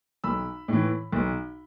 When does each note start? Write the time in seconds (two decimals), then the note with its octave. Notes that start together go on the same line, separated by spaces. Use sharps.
0.24 B1 B5 E6
0.68 A2 E3
1.12 B1